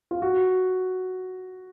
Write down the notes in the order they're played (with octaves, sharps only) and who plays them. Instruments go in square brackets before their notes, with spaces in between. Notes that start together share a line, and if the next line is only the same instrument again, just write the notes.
[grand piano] F4
F#4